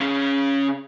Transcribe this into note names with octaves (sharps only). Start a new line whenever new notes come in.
C#3 C#4